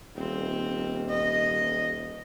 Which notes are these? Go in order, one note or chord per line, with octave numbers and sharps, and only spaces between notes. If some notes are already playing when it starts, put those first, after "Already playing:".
D#1 C4
D#5